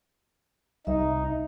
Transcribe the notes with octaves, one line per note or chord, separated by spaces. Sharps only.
C2 D#4 E5